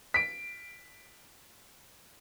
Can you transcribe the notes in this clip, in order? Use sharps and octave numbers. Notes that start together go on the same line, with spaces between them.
B6 D7